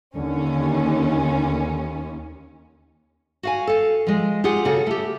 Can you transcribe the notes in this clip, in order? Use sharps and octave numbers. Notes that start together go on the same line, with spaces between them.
D#2 D3 C#4
F#4 F5 G#5
A4 F5
F3 G#3
F4 G4 G#4 F#5
C#3 F4 F#4 A4
A3 G4